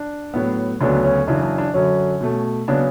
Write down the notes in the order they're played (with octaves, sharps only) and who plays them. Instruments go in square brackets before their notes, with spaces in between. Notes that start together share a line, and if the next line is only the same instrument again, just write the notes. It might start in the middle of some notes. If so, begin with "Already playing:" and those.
Already playing: [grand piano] D4
A2 F#3 B3
D2 C#3 F#3 B3 D4
C#4
F#2 C#3 E3 D4
D4
D4
F#2 D3 F#3 C#4
B2 A3
C#3 F#3 B3 D4